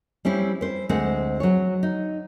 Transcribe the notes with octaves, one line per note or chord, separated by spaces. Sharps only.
G3 C4 C#4 E4
B4 C5
D2 G#3 C4 F#5
F#3 C#5
D#4